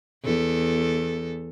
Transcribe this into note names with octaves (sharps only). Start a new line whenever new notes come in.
E2 A4